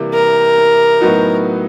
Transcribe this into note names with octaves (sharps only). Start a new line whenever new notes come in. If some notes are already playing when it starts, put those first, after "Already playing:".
Already playing: C3 E3 G3 A#3
A#4
A2 F#3 B3 D#4 F#4